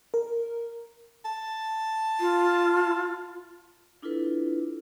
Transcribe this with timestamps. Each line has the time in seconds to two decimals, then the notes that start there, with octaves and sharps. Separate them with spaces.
0.14 A#4
1.25 A5
2.20 F4
4.02 D4 E4 F4 A4 B4